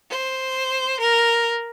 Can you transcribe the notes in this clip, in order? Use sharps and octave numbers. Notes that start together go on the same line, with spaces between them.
C5
A#4